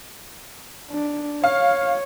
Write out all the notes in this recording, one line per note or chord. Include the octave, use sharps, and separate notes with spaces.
D4
C#5 F5